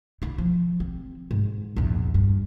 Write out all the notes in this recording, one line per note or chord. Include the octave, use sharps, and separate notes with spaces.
D3 E4
F3
C4
G#2
A#1 E2
G2